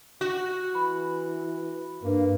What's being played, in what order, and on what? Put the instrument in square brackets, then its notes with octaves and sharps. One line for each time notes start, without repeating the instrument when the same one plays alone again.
[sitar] F#4
[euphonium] E3 [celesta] B5
[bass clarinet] G2 [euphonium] A#3